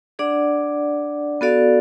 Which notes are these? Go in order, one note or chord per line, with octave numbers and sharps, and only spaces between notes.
D4 G#4 D5 F#5
B3 F#4 A4 D5 F5